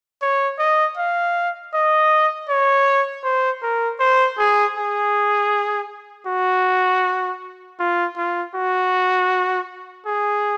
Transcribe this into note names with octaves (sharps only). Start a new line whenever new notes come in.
C#5
D#5
F5
D#5
C#5
C5
A#4
C5
G#4
G#4
F#4
F4
F4
F#4
G#4